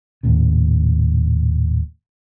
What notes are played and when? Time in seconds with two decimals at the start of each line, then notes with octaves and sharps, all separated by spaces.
0.23 D#1 D#2 A2 C#3